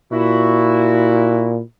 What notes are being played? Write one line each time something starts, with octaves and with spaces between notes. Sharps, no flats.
A#2 E4 F#4